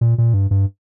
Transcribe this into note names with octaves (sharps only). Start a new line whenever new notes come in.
A#2
A#2
G2
G2